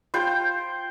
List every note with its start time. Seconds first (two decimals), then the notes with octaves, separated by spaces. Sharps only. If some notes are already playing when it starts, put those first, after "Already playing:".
0.14 F4 C5 G5